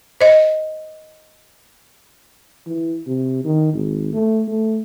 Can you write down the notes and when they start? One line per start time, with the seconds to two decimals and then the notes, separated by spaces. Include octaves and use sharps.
0.21 C5 D#5
2.67 E3
3.07 C3
3.44 D#3
3.74 G#1
4.13 A3
4.48 A3